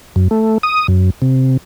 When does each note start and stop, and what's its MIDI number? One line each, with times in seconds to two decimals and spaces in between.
0.16 0.28 42
0.31 0.58 57
0.63 0.87 87
0.88 1.10 42
1.22 1.57 48